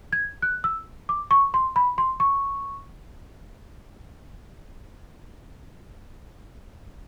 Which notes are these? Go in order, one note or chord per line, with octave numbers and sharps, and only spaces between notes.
G#6
F#6
E6
D6
C#6
C6
B5
C6
C#6